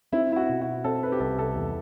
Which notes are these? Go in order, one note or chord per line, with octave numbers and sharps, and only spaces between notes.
C4 E4
E4
F#4
B2
F#4
C4 A4
B4
G4
C2 A4
A4
E2